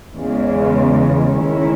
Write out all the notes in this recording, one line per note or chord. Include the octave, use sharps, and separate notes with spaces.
E2 C#3 G#3
D#3 G#3 C#4 E4